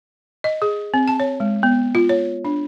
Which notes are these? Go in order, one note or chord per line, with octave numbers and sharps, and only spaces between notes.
D#5
G#4
C4
A5
C#5
G#3
B3
F4
C#5
D4